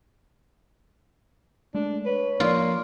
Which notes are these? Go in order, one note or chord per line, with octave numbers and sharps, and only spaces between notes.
G#3 A3 D4
B4 C#5
F3 A#3 D4 F4